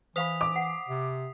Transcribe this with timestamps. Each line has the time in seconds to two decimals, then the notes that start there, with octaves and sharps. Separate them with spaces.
0.16 E3 C5 F5 B5 D#6 B6 F7
0.41 D6
0.56 F#5 C7
0.89 C3